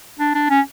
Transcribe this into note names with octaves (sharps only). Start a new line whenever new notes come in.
D4
D4
C#4